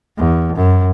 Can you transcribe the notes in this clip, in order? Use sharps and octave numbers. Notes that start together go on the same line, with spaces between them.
E2
F#2